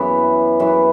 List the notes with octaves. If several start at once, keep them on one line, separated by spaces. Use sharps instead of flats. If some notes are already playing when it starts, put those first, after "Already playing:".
Already playing: F#2 E3 B3
F#2 E3 B3